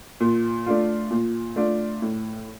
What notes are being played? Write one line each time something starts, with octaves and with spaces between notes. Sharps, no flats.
A#2
A3 D4 F4
A#2
A3 D4 F4
A2